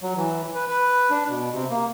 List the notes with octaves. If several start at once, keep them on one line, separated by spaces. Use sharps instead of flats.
F#3
E3
B4
B4
D4
B2
C3
A#3